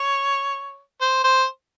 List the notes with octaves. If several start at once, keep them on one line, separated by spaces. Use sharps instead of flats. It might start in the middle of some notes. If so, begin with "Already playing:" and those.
Already playing: C#5
C5
C5